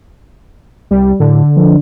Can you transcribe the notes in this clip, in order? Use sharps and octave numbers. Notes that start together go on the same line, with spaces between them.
C2 G3
A2 D3
F3